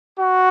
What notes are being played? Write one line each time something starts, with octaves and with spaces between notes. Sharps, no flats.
F#4